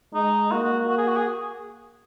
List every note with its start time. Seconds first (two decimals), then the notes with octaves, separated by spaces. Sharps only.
0.14 G#3 D#4
0.51 A#3 F#4
0.64 F#4
0.89 F#4
0.97 G#4
1.08 F#4
1.16 G#4